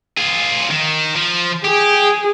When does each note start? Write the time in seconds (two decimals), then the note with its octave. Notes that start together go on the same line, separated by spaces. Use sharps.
0.18 F4 G#4
0.71 D#3
1.16 F3
1.65 G4 G#4